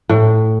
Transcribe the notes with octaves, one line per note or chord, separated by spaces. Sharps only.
A2